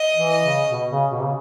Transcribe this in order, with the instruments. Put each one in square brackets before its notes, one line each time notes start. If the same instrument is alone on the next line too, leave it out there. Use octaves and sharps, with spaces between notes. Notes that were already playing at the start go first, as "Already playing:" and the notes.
Already playing: [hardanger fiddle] D#5
[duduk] E3
[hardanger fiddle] D#5
[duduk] C#3
B2
C#3
B2
C#3